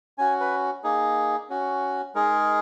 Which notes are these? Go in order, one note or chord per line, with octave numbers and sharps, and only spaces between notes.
C#4 F#4 G#5
B4
A#3 D#4 G#4
C#4 F#4
G#3 D#4 G#4 A#4